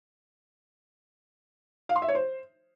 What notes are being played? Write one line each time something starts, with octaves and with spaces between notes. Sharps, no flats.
F5
C6
E5
C#5
C5